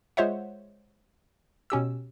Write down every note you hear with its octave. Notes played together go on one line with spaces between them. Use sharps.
G#3 F4 C5 C#5 E5 F#5
B2 C#4 G4 E6